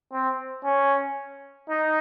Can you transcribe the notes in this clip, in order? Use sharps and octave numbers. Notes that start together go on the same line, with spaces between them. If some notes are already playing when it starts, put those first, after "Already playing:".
C4
C#4
D#4